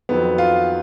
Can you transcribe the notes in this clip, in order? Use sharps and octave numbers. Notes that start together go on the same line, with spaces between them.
F2 D#3 F#3 B3
F4